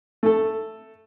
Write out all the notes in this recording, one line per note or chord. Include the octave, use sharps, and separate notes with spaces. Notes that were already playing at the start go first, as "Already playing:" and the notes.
A3 A4